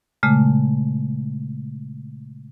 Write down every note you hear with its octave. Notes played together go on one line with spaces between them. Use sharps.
A#2 C#3 G#3 A3